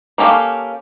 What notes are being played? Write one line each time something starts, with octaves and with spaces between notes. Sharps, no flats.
A#3 C#4 G4 A4 F5